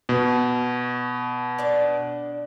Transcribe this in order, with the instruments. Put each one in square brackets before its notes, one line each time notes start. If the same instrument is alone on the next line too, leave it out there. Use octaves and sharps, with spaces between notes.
[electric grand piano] B2
[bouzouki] D4 D5